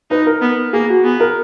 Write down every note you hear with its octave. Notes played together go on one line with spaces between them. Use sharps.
D#4 B4
A#4
B3
A#3 G#4
F#4
B3 G#4
A#4